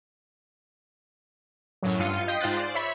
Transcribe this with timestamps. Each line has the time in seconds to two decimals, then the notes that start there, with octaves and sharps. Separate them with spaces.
1.83 F#2 A2 F#3
2.00 G2 F4 F5 C6 C#7 D#7
2.28 D#5 G5 C6 D#6 G6 B6
2.41 G#2 F4 C5 F#6 A6
2.57 C5 D5
2.74 C#5 E5 B5